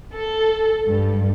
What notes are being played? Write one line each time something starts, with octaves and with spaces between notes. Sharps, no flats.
A4
G2